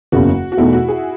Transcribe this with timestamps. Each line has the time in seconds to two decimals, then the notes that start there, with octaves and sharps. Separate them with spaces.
0.12 F#1 E2 C#3 F#4
0.52 F#4
0.57 E2 B2 A3 D#4 E4
0.73 F#4
0.88 G#4